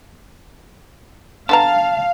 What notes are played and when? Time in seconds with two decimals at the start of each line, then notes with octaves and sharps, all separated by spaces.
1.49 D3 B3 F5 A5 A#5